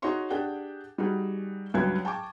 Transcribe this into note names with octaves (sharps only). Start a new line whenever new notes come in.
D#4 F#4 G#4 C#5 C6 C#6
D4 G4 G#4 F#5 G5
G3 D#4 F#4 G#4
C#2 G2 F#3 B4 G5 G#6
G5 A5 C#6 D6